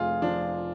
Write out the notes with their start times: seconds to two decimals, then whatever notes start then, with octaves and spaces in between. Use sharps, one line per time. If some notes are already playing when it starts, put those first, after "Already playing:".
Already playing: F1 F3 F4 G#4
0.22 F3 D4